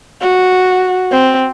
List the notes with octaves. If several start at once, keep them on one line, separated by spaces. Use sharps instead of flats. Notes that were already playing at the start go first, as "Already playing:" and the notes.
F#4
C4